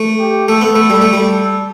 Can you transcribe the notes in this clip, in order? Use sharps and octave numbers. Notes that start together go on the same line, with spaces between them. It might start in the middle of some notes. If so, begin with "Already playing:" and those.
Already playing: A3
G4
A3 A4
B3
A3
G3
A3
G3
A4